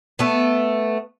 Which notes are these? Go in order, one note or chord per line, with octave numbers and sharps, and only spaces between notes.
A3 B3